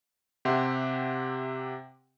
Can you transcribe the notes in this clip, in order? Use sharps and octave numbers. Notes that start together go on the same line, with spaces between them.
C3 G4 E5 F#5 C6